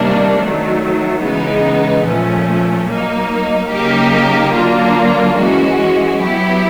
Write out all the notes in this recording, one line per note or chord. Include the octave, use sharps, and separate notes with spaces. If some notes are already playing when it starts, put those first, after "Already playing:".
Already playing: C3 D#3 G3 A#3 D4
D#3 F#3 A3
C#3 E3 G#3 B3 D#4
A#2 F3 A3 C#4
F#3 A#3 D#4
C#3 F#3 A#3 D#4 G4
D3 F#3 A#3 D4 F4
E3 G#3 C#4 F#4
F#3 B3 E4 G4